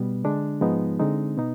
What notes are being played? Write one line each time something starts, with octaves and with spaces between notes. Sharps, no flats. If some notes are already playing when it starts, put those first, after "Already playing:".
Already playing: B2 G3 B3
D3 G#3 D4
G#2 F3 G#3 B3 D#4
D3 G#3 C4 D#4
B2 B3 D#4